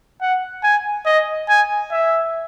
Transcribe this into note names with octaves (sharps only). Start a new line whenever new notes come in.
F#5
G#5
D#5
G#5
E5